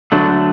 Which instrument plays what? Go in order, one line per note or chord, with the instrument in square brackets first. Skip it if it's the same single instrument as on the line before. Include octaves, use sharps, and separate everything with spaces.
[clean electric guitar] D2 D3 F#3 A3 D4